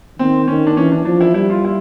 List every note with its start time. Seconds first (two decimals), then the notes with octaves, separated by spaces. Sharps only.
0.19 D#3 C4
0.48 D#3 C#4
0.67 D4
0.77 E3 C#4
0.92 D4
1.05 F3 D4
1.21 E4
1.34 G3 E4
1.50 F4
1.65 E4